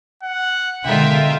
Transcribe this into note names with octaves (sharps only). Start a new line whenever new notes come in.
F#5
B2 D3 G#3 F4 A#4 E5 G5